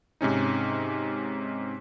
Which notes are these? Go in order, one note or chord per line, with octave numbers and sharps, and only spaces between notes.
G#2 C3 C#4 D#4